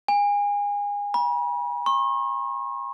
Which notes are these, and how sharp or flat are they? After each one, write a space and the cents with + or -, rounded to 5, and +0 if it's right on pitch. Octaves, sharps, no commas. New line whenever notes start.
G#5 -30
B5 -40
C#6 -45